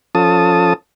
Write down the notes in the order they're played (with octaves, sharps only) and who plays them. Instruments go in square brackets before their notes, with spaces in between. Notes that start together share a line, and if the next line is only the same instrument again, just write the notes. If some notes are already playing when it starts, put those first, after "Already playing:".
[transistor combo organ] F3 C#4 F4 A4 A5 D#6